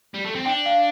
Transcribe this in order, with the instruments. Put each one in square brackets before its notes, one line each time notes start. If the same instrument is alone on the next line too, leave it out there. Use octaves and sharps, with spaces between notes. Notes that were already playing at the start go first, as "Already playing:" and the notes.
[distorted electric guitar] G3
A3
C4
[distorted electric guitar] D4 [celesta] G5
[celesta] F5